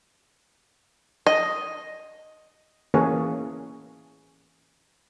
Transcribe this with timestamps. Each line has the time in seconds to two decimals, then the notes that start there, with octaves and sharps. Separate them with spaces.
1.27 D#5
2.94 E3 A#3 C#4 G#4 B4 C#5